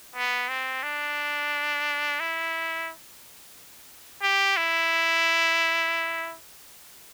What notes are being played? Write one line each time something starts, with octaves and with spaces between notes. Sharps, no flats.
B3
C4
D4
E4
G4
E4